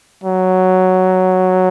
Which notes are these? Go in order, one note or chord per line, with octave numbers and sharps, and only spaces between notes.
F#3